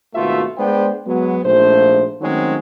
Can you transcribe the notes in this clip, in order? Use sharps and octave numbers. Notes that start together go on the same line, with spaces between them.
G#1 B2 A3 F4 F#4 E5
G#3 B3 D4 C5 D5 G5
F#3 G#3 B3
A#1 G#2 F3 A3 C5
D#3 F#3 G#3 A3 C4 C#4